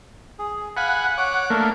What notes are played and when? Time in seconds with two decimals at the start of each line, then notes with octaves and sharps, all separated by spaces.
0.39 G#4
0.77 F5 F#5 G#5 B5
1.18 C#5 D6
1.50 A3 A#3 D4 A#4